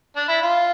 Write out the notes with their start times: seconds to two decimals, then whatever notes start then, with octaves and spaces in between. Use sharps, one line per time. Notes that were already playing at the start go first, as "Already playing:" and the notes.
0.16 D4
0.28 E4
0.42 F4